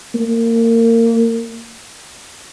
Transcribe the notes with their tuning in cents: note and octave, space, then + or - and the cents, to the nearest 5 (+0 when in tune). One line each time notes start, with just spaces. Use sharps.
A#3 -25